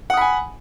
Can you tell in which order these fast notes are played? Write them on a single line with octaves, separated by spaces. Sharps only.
F#5 D#6 B5 G#5